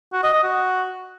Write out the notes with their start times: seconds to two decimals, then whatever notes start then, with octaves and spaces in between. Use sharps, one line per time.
0.13 F#4
0.23 D#5
0.33 D#5
0.43 F#4